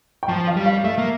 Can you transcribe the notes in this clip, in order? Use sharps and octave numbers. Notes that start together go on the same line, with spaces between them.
G5
F3 A5
F5
G3
F5
A3 E5
A#3